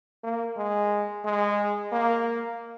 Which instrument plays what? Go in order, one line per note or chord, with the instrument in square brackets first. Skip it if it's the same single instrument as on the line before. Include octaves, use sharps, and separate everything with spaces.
[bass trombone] A#3
G#3
G#3
A#3